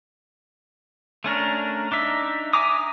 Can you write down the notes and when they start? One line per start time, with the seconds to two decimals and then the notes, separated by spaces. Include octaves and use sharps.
1.24 A3 C#4 D4 A#4
1.92 D4 D#4 E5
2.53 E5 G#5 A#5 D6 D#6